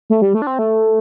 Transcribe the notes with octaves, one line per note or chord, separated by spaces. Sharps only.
A3
G3
A3
D4
C4
A3